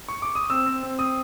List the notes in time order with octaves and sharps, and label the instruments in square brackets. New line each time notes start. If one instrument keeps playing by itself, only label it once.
[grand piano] C#6
D6
D#6
C4 E6
C4
C4
C4 D#6